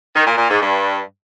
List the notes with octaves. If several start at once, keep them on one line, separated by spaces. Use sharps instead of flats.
D#3
A#2
A#2
G#2
G2